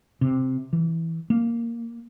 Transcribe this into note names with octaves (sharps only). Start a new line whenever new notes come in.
C3
E3
A#3